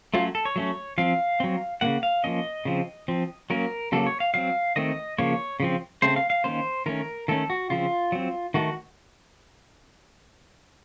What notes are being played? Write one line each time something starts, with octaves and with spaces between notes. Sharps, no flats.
F#3 A3 C#4 F4
A4
C#5
F#3 A3 C#4
F3 C4 F5
F#3 C4
C#3 F3 A#3 F#5
F5
F3 A#3 C#4 D#5
C#3 F3 C4
F3 C4
F#3 A#3 C#4 A#4
C#3 F#3 A#3 A4
C#5
F5
F#3 C4 F5
D#3 A3 C4 D#5
C#3 F3 A#3 C#5
C#3 F3 C4
C#3 A3 C4 C5
F5
F5
D#3 A#3 C#4 C5
D#3 A3 C#4 A#4
D#3 A3 C#4 A4
F#4
C#3 F3 C4 F4
F#3 C4
D#3 A3 F#4